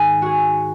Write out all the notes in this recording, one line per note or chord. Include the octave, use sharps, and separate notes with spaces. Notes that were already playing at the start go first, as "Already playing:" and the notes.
Already playing: G#2 D#3 G#4
F#4 G#4